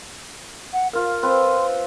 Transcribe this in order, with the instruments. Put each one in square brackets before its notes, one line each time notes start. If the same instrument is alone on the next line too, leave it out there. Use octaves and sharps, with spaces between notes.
[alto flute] F#5
[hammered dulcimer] F4 F5 [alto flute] A#4
[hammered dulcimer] C4 B4 [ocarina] C6